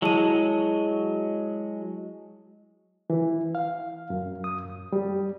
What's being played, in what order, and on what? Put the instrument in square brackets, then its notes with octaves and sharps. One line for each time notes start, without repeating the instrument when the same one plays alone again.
[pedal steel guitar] F#3 G#3 [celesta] E4 A5 D#7
[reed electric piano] E3
F5
F#2
D#6
F#2
G3